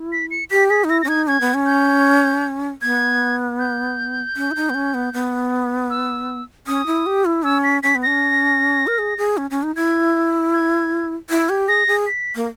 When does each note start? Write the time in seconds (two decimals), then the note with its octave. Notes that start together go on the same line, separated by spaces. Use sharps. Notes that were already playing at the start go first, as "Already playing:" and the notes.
Already playing: E4
0.12 B6
0.31 C#7
0.51 G4 B6
0.70 G#4 B6
0.84 D#4
0.89 E4 A#6
1.02 A#6
1.04 C#4
1.08 D#4 G#6
1.28 C#4 G#6
1.41 B3
1.54 C#4
1.66 G6
2.82 B3 G#6
3.59 G6
4.36 C#4
4.51 E4
4.56 D#4
4.70 B3
4.74 C#4
4.94 B3
5.13 B3
5.90 E6
6.67 C#4 D#6
6.86 E4
7.06 G4
7.25 E4
7.44 C#4 E6
7.64 B6
7.83 C#4 B6
7.95 B3
8.03 C#4 A#6
8.87 A#4
8.98 G#4
9.18 G#4
9.37 C#4
9.50 C#4
9.63 D#4
9.76 E4 G#6
10.53 G#6
11.30 E4 G#6
11.49 G4
11.68 G#4 A#6
11.87 G#4
12.07 B6
12.35 A#3